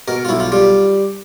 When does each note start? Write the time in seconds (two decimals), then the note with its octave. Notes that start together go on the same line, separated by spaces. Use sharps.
0.08 B2 A#4
0.25 F4
0.29 B1 E4
0.40 F4
0.52 G3 F4